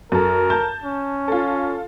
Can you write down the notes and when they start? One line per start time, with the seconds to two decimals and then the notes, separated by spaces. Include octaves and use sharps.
0.12 F#2 A4 A#4
0.50 A5 G6
0.84 C#4
1.28 F4 A4